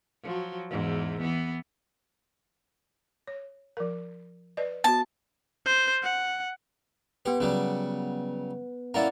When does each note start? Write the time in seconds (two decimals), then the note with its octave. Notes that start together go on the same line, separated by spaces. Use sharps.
0.23 F3 F#3
0.70 E2 G#2 E3
1.21 E3 B3
3.27 C#5
3.77 F3 A#4
4.57 B4 D5 D#5
4.84 B3 F#4 A5
5.65 C5
6.03 F#5
7.25 B3 G4 B4
7.40 C#3 F#3 G3
8.94 A#3 C#4 E4 D5 F#5 A#5